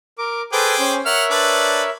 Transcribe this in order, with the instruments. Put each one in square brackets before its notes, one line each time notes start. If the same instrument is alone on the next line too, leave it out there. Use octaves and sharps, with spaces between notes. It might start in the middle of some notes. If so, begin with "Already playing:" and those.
[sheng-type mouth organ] A#4 D6
[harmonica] G#4 G5 D6 [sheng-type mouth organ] A4 B4 C5
[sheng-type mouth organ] C#4 C5
[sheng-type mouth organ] A#4 C#5 E5 [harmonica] F#5 F6
[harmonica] D4 B4 D5